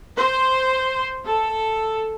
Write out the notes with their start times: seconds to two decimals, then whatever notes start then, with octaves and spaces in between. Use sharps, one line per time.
0.16 C5
1.25 A4